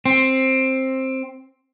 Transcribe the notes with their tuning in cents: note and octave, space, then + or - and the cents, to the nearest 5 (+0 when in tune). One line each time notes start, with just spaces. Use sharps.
C4 +10